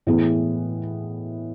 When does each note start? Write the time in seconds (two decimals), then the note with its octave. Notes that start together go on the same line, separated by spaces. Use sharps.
0.07 A2 E3 G#3 B3